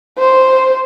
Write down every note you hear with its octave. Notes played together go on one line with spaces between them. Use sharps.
C5